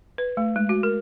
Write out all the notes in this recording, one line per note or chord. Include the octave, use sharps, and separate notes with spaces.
B4
A3
G#3
F#4
A#4